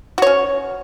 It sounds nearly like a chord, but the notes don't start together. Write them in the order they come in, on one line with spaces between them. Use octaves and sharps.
F#4 C#5 C#4